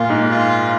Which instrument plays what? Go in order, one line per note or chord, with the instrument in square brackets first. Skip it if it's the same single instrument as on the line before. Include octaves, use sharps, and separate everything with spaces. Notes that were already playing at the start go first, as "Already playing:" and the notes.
Already playing: [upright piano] A#2 [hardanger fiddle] F4
[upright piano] G#2
[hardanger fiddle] F4